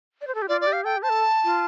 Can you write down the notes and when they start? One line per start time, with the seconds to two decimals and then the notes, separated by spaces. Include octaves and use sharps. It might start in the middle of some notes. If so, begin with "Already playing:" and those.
0.21 D5
0.27 C5
0.35 A4
0.42 G4
0.49 F4 D5
0.61 D5
0.67 G4
0.73 F5
0.84 A4 G5
0.97 G4
1.03 C5 A5
1.09 A4
1.44 F4